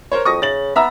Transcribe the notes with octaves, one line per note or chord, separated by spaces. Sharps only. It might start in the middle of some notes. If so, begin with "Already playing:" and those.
A#4 C5 C#5
F2 C#6 D#6 A#6
C#3 A6 F#7
B3 E5 A#5 E6